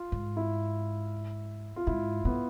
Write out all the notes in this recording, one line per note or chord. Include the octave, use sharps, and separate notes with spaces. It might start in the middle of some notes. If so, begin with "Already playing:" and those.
Already playing: F4
G#2
E4
F4
G#2 E4
A2 B3